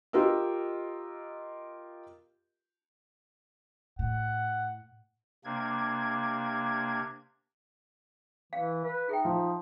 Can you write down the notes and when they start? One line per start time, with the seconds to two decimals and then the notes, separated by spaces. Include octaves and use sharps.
0.13 F4 G4 A#4 D#5 E6
3.99 A2 F#5
5.45 C3 A#3 D4 G#6
8.53 E3 F5
8.84 B4
9.09 D#4 G#4 E5 G5
9.25 F3